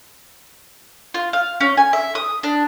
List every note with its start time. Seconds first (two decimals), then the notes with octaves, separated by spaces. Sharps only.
1.14 F4
1.33 F5
1.61 C#4
1.77 G#5
1.93 E5
2.15 D#6
2.43 D4